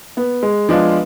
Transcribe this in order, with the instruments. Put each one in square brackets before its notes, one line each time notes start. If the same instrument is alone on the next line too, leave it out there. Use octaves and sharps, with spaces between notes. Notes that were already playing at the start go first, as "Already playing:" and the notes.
[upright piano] B3
G#3
[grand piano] F3 G#3 D4 F4 [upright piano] B3